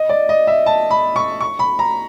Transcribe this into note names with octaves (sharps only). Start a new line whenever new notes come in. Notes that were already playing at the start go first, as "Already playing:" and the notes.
Already playing: D#5
D5
D#5
E5
A5
B5
C#6
C#6
B5
A#5